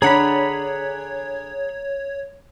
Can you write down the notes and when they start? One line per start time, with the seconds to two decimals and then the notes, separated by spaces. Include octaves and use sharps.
0.02 D3 D4 G#4 C#5 F#5 A#5 B5